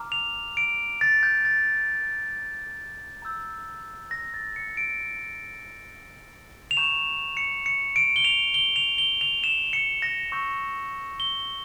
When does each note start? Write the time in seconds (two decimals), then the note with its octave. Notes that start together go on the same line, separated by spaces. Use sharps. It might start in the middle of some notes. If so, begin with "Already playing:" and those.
Already playing: A#5 D6 F6
0.12 F7
0.57 D7
1.01 A6
1.23 G6
1.45 A6
3.22 A#5 E6 G6
4.11 A#6
4.34 A6
4.56 C#7
4.77 D7
6.71 F7
6.77 A#5 C#6 G6 E7
7.37 C#7
7.66 C#7
7.96 D7
8.16 G7
8.25 F7
8.54 G7
8.76 F7
8.98 G7
9.21 F7
9.44 E7
9.73 C#7
10.02 A#6
10.32 C#6 E6 G6
11.20 G7